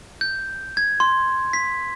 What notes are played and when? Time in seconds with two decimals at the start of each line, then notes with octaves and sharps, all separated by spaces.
0.21 G6
0.77 G#6
1.00 C6
1.53 B6